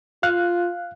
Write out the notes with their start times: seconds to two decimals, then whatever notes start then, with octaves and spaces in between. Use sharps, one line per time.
0.23 F4 F5 F#6